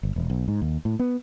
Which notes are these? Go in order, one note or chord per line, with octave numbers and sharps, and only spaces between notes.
G1
E1
B1
G#2
D#2
A2
B3